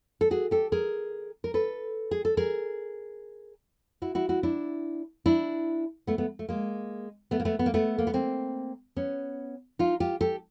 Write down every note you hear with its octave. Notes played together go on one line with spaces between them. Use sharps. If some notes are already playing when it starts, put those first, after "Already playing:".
A4
F#4 G#4
G4 A4
G#4 A#4
A#4
A4 B4
G#4
A4
G#4 A#4
E4 F#4
E4 F#4
E4 F#4
D4 E4
D4 E4
A3 B3
A3 B3
A3
G#3 A#3
A3 B3
A#3
A3 B3
B3
A#3
A3 B3
A#3
B3
A#3 C4
B3 C#4
D#4 F4
F4 G4
G4 A4